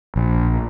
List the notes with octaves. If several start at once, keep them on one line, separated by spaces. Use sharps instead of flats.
A#1